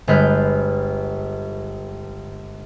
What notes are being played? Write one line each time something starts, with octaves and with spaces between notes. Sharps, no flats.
G1 G#3 B4 F6 G6